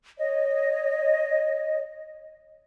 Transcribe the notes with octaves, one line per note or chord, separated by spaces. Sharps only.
C#5 D#5